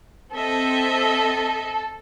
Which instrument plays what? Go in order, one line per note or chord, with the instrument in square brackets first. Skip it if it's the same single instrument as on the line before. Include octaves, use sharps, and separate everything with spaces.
[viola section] C4 [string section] A4 [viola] D#5 E5